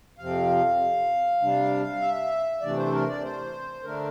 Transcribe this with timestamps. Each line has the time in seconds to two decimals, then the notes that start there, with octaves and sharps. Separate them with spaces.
0.18 F2 C3 F3 C4 F5
1.40 C3 G3 D4
2.01 E5
2.61 C3 E3 A3 D4 D5
2.77 C5
2.86 A4
2.92 A#4
3.07 D5
3.22 C5
3.83 D3 A3 D4 A#4